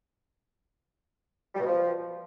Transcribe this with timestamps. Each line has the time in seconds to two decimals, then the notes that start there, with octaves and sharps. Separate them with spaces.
1.55 G3
1.60 B2
1.66 F3